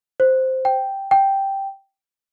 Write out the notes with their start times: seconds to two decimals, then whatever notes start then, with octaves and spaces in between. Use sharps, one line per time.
0.20 C5
0.65 G5
1.11 G5